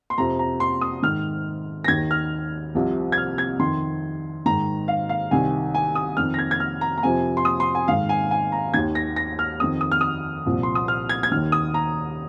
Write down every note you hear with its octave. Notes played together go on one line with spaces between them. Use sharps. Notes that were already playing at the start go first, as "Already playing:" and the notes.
C6
F2 C3 F3 A#5
A#5
C6
D#6
G#2 D#3 F6
A#6
D#2 D#3 G#6
F6
C2 C3 F3
G#6
F6
G#6
F2 D#3 C6
G#2 D#3 A#5
F5
F5
C2 C3 D#3 G#5
G#5
D#6
F2 D#3 F6
A#6
G#6
G#6
F6
A#5
A#5
F2 C3 F3 G#5
C6
D#6
C6
G#5
G#2 D#3 F5
G#5
G#5
A#5
D#2 D#3 G#6
A#6
A#6
F6
F2 D#3 D#6
D#6
F6
D#6
C2 A#2 F3
C6
D#6
F6
G#6
G#6
D#2 D#3 F6
D#6
A#5